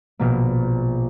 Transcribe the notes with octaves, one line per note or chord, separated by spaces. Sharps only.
A#1 B2 A#3